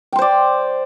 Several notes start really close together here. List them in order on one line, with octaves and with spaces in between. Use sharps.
G5 C6 C5 D5